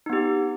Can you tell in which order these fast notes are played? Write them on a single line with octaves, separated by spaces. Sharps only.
D#4 B3 G4